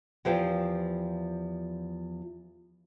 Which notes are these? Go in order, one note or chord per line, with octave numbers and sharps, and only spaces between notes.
E2 F3 G4 C5 F5